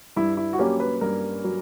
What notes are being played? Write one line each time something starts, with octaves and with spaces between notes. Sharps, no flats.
G2 E4
E4
F#4
F#3 A#3 C#4 G4
B4
G2 A#4
F#3